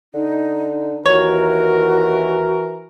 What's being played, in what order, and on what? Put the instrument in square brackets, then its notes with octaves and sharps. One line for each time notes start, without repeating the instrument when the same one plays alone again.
[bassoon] D3 [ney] D#4
[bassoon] D#2 [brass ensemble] E3 A#4 [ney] F#4 [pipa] C#5